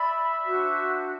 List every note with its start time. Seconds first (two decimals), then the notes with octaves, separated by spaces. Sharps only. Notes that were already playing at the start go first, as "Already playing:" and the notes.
Already playing: D5 E5 B5
0.42 D4 F#4 C5